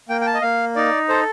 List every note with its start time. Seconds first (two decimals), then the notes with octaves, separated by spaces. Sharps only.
0.09 A#3 G5
0.21 G5
0.26 A5
0.34 D#5
0.42 A#3 F5
0.76 D#4 D5
1.09 A4 C5